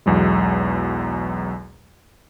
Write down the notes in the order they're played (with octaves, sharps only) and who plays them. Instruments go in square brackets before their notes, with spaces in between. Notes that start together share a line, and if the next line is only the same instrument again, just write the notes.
[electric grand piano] B1 E2 F#3 G#3